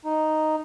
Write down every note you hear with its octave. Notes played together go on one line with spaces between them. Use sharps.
D#4